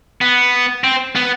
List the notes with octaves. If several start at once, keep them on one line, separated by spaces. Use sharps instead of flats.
B3
C4
B3